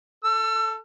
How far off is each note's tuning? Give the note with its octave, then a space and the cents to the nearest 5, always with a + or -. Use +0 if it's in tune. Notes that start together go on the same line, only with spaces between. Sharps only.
A4 +0 E6 +35